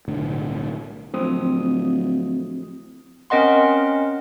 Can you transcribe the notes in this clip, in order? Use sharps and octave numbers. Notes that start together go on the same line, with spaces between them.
B1 A2 D3
D1 F3 C4 D#6
C4 C#4 A#4 D#5 F#5 C6